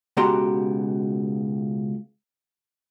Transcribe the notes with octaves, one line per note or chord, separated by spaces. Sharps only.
C#2 B2 F#4 G4 A#5 C6